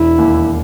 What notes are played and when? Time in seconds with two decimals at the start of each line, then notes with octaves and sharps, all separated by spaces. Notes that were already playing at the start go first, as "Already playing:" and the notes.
Already playing: E1 E4
0.18 D#2